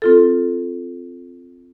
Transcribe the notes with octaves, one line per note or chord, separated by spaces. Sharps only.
C4 F4 A4